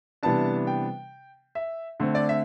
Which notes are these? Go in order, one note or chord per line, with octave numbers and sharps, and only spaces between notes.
C3 E3 G3 B3 D4 A5
G5
E5
D3 A3 C4
D5
E5